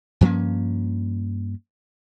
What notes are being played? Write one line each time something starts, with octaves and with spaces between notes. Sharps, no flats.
G2 F3 A#3 C#4